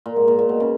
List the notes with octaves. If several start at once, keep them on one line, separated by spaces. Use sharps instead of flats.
A#2
G#2
A#2
A#2
B2
C#3